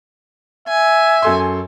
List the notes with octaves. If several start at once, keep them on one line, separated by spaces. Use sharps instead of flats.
E5 G#5
F#2 A4 C6